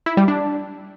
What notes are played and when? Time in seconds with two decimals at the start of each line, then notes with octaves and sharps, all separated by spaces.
0.06 E4
0.17 G3
0.28 D4